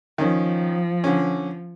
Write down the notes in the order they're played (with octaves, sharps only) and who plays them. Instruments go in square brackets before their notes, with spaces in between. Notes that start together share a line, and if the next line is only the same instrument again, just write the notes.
[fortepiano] D#3 C#4 [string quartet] F3
[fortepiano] D3 C#4